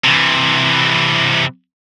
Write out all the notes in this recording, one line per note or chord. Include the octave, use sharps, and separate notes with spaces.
C3 E3